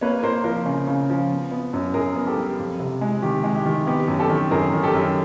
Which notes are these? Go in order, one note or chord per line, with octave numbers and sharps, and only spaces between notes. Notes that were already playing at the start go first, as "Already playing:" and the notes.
A#3 B4 C#5
A#3 A#4 C5
F3 A#4 C5
C#3
C#3
F3
B3
B3
F#2
F#2 G#4 A#4
B3
G4 A4
G3
F2
C3
G#3
D#3 G4
G#3
G4
D#3
B3 G4
F#2
G4 A4
D#3
F#2 G#4 A#4
D#3
G4 A4
F#2